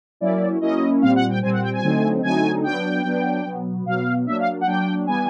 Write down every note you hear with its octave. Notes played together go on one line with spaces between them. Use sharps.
F#3 A#3 C#4 E4 D5
F#3 A#3 C#4 E4 D#5
A#2 G3 C4 F5
F#5
G5
A#2 G3 C4 G#5
F#5
G5
G#5
D3 F#3 A3 C4 D#4
D3 F#3 A3 C4 D#4 G#5
F#3 B3 D4 G5
F#3 B3 D4
B2 F#3 B3
B2 F#3 B3 F5
F#3 A#3 D4 E5
F5
F#5
F#3 A#3 D4 G5
E3 G3 B3 G#5